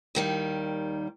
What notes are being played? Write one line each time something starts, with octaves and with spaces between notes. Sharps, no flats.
D#2 D#3 G3